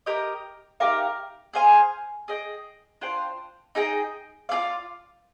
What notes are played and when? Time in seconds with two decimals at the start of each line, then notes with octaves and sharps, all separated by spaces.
0.06 G4 A#4 D#5
0.80 D#4 G4 A#4 F5
1.53 G#4 C5 F5 G#5
2.28 G#4 D#5 G5
3.01 D4 F4 C5 G5
3.75 D#4 G#4 D#5 G5
4.49 F4 G#4 D5 F5